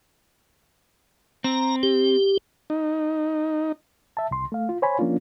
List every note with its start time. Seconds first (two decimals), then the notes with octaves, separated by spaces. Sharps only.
1.44 C4 A#5
1.83 G4
2.70 D#4
4.17 E5 A5
4.31 C2 C6
4.52 A3 F5
4.69 F4
4.82 C5 C#5 G#5 B5
4.99 F3 A#3 C#4 D4 F4